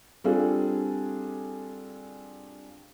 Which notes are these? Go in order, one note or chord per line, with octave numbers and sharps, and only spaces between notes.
G3 C4 D4 F4 G#4 A4